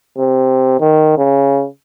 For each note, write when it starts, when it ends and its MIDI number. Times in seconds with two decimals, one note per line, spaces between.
0.18 0.75 48
0.80 1.14 51
1.18 1.66 49